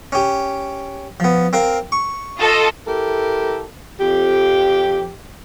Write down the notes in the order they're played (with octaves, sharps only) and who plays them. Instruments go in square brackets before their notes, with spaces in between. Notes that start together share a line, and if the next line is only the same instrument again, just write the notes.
[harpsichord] C#4 G4
F3 B3
C4 A#4 F5
C#6
[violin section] F4 A4 D#5
[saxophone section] E4 G4 A4 A#4
F2 G4